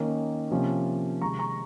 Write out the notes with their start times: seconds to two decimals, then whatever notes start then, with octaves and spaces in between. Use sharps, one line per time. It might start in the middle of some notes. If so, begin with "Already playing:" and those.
Already playing: D#3 A#3 C#4
0.51 C3 F3 A#3 C#4
1.21 C3 D#3 G#3 A#5 C#6
1.39 A#5 C#6